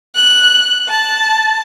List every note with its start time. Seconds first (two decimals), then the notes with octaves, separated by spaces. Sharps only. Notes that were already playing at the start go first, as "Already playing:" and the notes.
0.15 F#6
0.88 A5